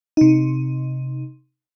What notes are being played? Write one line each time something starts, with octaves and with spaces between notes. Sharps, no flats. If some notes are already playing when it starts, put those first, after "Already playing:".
C3 D#4